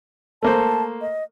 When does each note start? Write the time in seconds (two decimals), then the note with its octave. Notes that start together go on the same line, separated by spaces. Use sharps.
0.43 A3 A#3 C5 A5
1.01 D#5